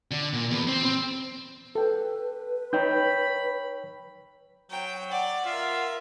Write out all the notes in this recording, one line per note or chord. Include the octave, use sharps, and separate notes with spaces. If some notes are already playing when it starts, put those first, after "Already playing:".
D3
A#2
E2
C4
C4
A4 B4 G5
D#4 C#5 G5 A#5 B5 G6
F#3 G5
D5 F#5
F4 A#4 E5